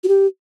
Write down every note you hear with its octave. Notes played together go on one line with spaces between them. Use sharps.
F#4
G4